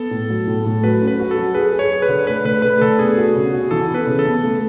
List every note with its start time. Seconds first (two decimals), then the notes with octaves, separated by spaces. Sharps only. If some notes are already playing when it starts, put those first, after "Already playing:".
Already playing: B3 A4
0.11 A2
0.30 F#3
0.47 A2
0.65 A2
0.83 F#3 B4
1.02 C#4
1.08 B4
1.20 F#4
1.31 A4
1.37 F#3
1.54 G#4 B4
1.72 G#4
1.79 C#5
1.91 G#4
2.02 B4
2.09 D3
2.27 A3 B4
2.45 D3 B4
2.62 A3 B4
2.81 D3 A4
2.99 B3 G#4
3.17 F#4
3.35 C#3
3.53 F#4
3.71 E3 A4
3.89 B3
3.94 B4
4.07 C#3
4.19 A4
4.25 B3
4.43 A3